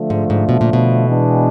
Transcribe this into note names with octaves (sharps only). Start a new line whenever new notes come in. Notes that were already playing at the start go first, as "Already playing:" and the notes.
Already playing: D3 F3 A3
G#2
G#2
B2
A#2
B2
E3 G#3 B3 D4